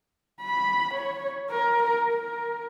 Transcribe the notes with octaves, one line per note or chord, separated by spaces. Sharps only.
B5
C#5
A#4
A#4
A#4